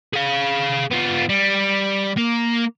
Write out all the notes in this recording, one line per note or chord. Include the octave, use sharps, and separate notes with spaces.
G#4 F5
B3 F4
G3
A#3